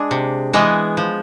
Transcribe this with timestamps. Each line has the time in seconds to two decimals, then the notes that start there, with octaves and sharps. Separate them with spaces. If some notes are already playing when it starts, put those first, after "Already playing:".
Already playing: G#3 D4 G#4
0.11 C3
0.53 E3 G#3 B3
0.97 F3